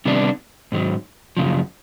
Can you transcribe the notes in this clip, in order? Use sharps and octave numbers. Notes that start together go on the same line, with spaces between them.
C3 D#3 G3 B3 D4
G#2 D#3 F#3
F#2 C#3 F3